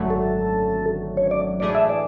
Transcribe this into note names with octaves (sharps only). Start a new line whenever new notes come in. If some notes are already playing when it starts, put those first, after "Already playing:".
Already playing: G#1 F#2 D3 F#3 A3
A4
C#5
D5
A2 E3 A3 D4 G#4 D5
E5
D5